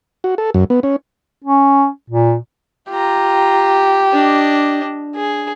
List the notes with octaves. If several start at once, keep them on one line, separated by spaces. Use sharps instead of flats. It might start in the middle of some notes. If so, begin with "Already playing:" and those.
F#4
A4
F#2
B3
C#4
C#4
A#2
F4 G4 A#5
D4 D#5
G#4